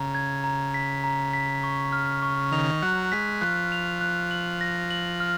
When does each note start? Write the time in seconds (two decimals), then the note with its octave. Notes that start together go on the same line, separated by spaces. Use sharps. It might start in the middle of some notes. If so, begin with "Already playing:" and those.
Already playing: C#3 A#5
0.15 G#6
0.44 A#5
0.74 B6
1.04 A#5
1.33 B6
1.63 C#6
1.92 F6
2.23 C#6
2.52 D#3 F7
2.82 F#3 F#6
3.12 G#3 B6
3.42 F3 F#6
3.72 F7
4.01 F#6
4.31 F#7
4.61 A#6
4.90 F#7
5.20 F6